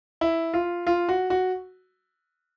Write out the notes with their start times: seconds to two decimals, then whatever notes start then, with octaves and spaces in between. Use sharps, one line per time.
0.21 E4
0.54 F4
0.87 F4
1.09 F#4
1.30 F#4